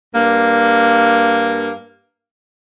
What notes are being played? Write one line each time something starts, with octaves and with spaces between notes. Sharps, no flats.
G2 A#3